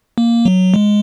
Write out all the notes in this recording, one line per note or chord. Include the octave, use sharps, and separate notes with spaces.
A#3
F#3
G#3